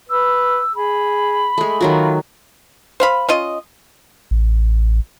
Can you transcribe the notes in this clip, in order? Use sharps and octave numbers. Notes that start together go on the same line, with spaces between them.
B4 E6
G#4 B5
G#3 A3
D#3 F#3 F4 F#4
C5 F5 B5
C#4 F4 D#5
A1